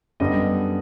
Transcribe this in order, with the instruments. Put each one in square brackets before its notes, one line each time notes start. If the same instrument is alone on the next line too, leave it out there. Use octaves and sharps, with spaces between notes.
[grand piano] F#2 D3 G3 B3 D#5